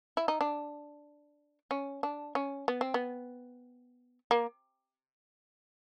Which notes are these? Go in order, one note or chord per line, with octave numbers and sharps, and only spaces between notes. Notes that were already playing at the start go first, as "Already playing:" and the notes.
E4
D#4
D4
C#4
D4
C#4
B3
C4
B3
A#3